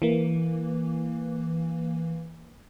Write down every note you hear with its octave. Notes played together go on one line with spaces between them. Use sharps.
E3 A#3